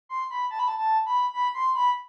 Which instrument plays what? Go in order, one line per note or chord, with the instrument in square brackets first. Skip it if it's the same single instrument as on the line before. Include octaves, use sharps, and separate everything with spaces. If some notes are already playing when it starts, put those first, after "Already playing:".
[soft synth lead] C6
B5
A5
B5
A5
A5
B5
B5
C6
B5